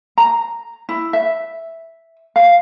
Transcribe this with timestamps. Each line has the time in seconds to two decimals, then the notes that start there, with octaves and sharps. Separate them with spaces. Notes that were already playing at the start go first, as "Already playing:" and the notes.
0.18 A#5
0.89 E4
1.13 E5
2.36 F5